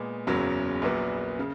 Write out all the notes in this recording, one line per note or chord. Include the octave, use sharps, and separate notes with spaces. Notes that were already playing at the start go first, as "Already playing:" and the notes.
Already playing: A#2 G#3 B3
F#1 E2 C#3 F#3 C#4
A#1 A#2 F#3 B3
C#3